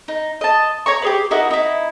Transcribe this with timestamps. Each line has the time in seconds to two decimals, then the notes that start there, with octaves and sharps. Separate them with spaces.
0.08 D#4
0.41 D#5 A5
0.86 C#5 A#5 C#6
1.02 G4 G#4 B4
1.31 D#4 E4 F#4 A#4
1.51 D#4 E4